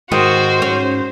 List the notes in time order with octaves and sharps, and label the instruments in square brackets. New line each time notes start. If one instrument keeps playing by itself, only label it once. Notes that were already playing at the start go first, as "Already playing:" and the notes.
[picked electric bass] G#2 [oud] D#3 [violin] F#4 [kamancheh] C5
[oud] C#4